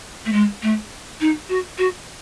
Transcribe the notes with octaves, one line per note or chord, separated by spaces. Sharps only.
A3
G#3
A3
D#4
F#4
F#4